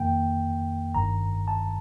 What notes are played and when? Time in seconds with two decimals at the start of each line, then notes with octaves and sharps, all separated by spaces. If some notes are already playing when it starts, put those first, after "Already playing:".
Already playing: F2 D#3 A#3 G5
0.94 G1 G2 D#3 A#5
1.48 A5